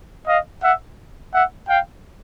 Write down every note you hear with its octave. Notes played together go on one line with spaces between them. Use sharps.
D#5 F5
E5 F#5
E5 F#5
F5 G5